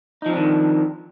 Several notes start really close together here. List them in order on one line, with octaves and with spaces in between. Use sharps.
D#4 F3 C4 D4 D#3